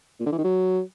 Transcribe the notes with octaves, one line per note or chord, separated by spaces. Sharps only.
A#2
D3
E3
D#3
F#3